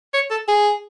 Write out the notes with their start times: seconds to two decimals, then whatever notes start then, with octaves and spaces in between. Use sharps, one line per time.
0.14 C#5
0.31 A4
0.48 G#4